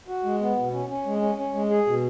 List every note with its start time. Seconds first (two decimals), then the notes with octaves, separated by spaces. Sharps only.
0.08 F#4
0.25 G#3
0.41 B3
0.57 B2
0.73 C#4
0.90 C#4
1.06 G#3
1.22 C#4
1.38 C#4
1.54 G#3
1.70 G#4
1.87 B2